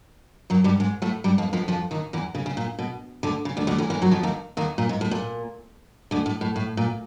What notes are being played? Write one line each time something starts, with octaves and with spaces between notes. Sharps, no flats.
F#2 F#3
G2 G3
G#2 G#3
A2 A3
G2 G3
F2 F3
F2 F3
F2 F3
D#2 D#3
E2 E3
C#3
C#3
A#2
B2
D2 D3
C#3
D2 D3
D2 D3
E2 E3
E2 E3
F#2 F#3
F2 F3
D#2 D#3
D#2 D#3
A#2
G#2
A2
A#2
D2 D3
A2
A2
A2
A#2